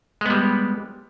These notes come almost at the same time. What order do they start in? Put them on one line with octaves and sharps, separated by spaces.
G#3 B3 G3